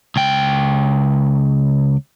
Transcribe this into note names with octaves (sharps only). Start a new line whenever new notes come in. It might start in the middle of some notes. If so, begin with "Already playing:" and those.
C#2 G5